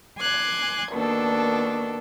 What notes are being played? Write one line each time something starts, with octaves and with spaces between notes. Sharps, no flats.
G#5 C6 D6 F#6 G#6
B2 D#3 A#3 D4 A4